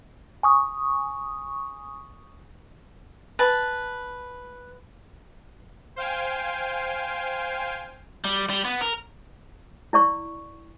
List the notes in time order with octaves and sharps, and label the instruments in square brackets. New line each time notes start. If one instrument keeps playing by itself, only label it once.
[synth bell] G#5 C#6 D#6
[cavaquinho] B4 A5
[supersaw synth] C5 F5 G5 G#5
[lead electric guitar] G3
G3
B3
A#4
[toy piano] E4 D5 C#6